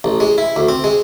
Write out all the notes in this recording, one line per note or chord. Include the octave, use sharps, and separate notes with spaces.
A1
G#3
E4
D2
C4
G#3